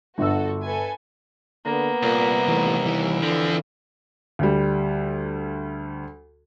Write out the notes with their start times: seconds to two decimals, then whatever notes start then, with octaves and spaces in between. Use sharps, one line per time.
0.18 G1 F#4 A4 E6
0.64 A4 B4 G#5
1.65 D3 A#3 B3
2.03 C2 A#2
2.48 D#2 E3 A3
2.86 E3
3.23 D3 F3 C4
4.39 D2 G3